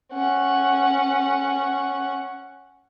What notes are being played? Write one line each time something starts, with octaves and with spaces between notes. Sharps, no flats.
C#4 F#5